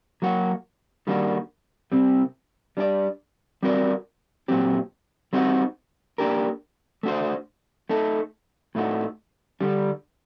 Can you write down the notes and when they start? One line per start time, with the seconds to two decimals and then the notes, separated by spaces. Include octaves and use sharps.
0.22 F#3 A#3 F#4
1.07 D#3 G3 A#3 D4 F#4
1.92 C3 G3 C4
2.77 G3 D4 G4 D5
3.63 G3 C4 F#4 A#4 D5
4.48 A#2 F#3 C4 G4
5.33 G3 C4 D#4 F#4
6.18 A#3 D4 G4 A#4
7.03 A3 D4 F#4 C5
7.89 A3 D#4 A4
8.75 A2 A3 D#4 F#4
9.60 D3 G3 D4